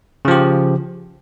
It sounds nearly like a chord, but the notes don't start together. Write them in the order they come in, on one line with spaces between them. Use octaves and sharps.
C#3 F3 G4